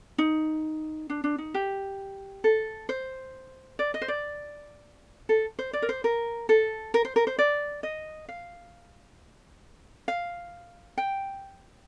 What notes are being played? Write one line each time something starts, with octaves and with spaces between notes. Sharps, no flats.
D#4
D4
D4
D#4
G4
A4
C5
D5
D#5
C5
D5
A4
C5
D5
A#4
C5
A#4
A4
A#4
C5
A#4
C5
D5
D#5
F5
F5
G5